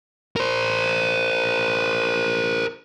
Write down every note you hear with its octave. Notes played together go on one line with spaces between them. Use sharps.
A#4 C5